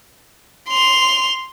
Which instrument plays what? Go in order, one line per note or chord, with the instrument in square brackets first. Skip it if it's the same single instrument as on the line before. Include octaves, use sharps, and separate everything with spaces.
[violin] C6 F7